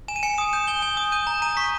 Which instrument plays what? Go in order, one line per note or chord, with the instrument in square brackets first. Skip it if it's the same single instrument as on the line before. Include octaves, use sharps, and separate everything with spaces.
[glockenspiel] G#5 E7
D#7
G#5 C#7
D#6 E7
G6 E7
G#5 G7
G#5 G7
D#6
G6 D#7
A#5
A#5 D#7
C#6 B6